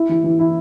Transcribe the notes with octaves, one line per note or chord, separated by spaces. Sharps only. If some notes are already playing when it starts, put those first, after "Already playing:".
Already playing: E4
E3
E3
E4